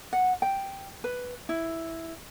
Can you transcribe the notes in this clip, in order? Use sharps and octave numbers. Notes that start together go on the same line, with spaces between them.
F#5
G5
B4
E4